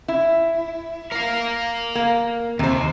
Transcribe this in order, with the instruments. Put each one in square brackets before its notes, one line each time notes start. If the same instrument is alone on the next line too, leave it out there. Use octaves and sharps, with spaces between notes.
[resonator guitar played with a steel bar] E4
[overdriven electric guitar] A#4 F5
[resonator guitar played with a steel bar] A#3
[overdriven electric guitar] D#2 [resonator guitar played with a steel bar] C3 C5